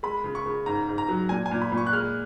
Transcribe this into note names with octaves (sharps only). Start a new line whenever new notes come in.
G#3 B5
C#3
C#6
C#3
G#2 A#5
G#2
A#5
F#3
A#2 G#5
G#5
A#2
B5
A#2
C#6
F#6
G#3 F6